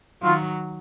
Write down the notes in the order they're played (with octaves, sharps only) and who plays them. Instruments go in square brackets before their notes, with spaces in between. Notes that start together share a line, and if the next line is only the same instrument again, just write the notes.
[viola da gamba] D#3 F#3 [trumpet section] F4